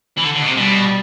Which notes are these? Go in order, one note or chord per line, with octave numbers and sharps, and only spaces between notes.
E3
D3
D3
B2
C3
B2 G3